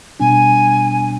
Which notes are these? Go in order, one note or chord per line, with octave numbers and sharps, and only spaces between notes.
B2 G3 B3 D4 G#5